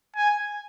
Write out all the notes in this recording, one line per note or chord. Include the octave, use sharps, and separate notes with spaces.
G#5